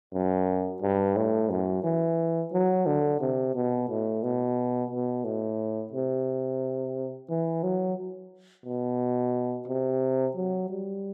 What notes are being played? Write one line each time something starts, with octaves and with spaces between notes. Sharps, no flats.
F#2
G2
A2
F#2
E3
F#3
D3
C3
B2
A2
B2
B2
A2
C3
E3
F#3
B2
C3
F#3
G3